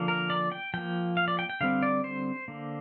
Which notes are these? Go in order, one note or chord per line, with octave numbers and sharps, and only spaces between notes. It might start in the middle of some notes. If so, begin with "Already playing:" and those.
Already playing: D3 F3 A#3
A#4
D5
G5
F3 A#3 G5
F5
D5
G5
G5
D3 G3 C4 F5
D5
C5
D3 A#3